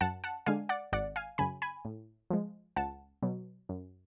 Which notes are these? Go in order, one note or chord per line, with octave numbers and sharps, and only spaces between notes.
F#2 F#5 A5
F#5 A5
D3 G#3 D4 F5 G#5
D5 F#5
G#1 D5 F#5
F5 G#5
F#2 C#3 G#5 B5
G#5 B5
A2
F3 G#3
C#2 F#5 A5
B2 F#3
F#2